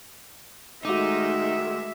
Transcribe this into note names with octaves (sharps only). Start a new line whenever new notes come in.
D#3 G#3 A3 D#4 F#4 E5 D6